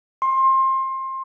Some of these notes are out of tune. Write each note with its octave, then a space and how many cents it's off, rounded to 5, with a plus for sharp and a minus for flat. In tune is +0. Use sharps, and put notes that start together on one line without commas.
C6 +25